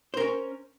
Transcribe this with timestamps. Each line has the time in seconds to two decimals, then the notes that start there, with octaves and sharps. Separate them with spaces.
0.14 C5
0.17 A#4
0.20 C#4